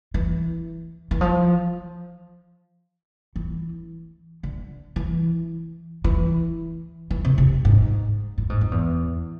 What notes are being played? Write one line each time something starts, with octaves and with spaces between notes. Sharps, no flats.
E3
E3
F3
E3
D3
E3
E3
E3
C3
C3
G#2
A2
G#2
F2
E2